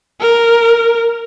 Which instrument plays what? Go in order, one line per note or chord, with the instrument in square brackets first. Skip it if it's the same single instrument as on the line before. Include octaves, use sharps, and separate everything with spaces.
[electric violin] A#4